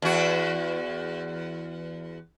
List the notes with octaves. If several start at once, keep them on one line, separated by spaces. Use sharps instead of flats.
E2 F#4